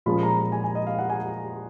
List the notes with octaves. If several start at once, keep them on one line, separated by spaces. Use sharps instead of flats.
A#2 F3 G#3 C#4 F4 B5
A#5
G#5
G#5
D#5
F5
F#5
G#5